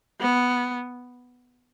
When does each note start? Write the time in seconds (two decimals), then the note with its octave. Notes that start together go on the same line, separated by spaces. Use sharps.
0.20 B3